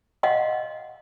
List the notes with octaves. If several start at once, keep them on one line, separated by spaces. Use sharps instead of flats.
D#5 F5 F#5 C6